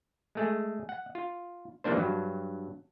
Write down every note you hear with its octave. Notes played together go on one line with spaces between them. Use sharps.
G#3 A3 G#4
F#5
F4
E3 F3 G3 A#3 D4 C5
G2 F#3